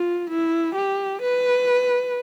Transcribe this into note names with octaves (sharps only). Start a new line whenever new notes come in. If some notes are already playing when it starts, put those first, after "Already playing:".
Already playing: F4
E4
G4
B4